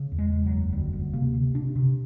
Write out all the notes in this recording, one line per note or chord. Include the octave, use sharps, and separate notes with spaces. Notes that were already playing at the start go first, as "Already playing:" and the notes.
Already playing: C#3
E2
G#3
E2
F#3
F#1
D2 G3
D2
C3 A#3
C3
C3 D4
C3